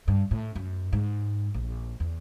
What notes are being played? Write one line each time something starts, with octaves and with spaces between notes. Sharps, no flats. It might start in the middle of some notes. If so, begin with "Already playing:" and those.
G2
A2
F#2
G#2
A#1
E2